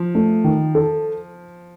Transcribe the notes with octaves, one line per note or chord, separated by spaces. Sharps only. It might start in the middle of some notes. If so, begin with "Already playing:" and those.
Already playing: F3
A3
D#3
A4